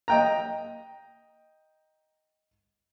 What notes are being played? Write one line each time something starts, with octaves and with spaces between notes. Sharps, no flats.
D#5 G5 A#5